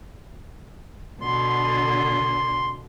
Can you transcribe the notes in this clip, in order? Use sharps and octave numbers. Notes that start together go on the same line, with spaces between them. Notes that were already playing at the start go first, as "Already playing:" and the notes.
B2 D3 C6